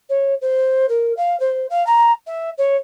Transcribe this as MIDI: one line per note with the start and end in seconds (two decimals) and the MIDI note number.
0.09 0.34 73
0.41 0.86 72
0.89 1.15 70
1.16 1.38 77
1.39 1.66 72
1.70 1.85 77
1.86 2.11 82
2.26 2.50 76
2.57 2.76 73